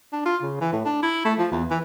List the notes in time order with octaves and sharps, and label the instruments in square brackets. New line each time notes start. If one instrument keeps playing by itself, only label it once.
[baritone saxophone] D4
F4
C#3
E3
A2
D4
E4
A3
F3
E2
E3